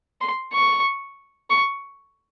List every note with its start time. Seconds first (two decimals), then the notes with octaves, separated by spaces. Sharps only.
0.21 C6
0.53 C#6
1.50 C#6